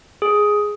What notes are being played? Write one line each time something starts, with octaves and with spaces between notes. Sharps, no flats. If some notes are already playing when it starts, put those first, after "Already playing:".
G#4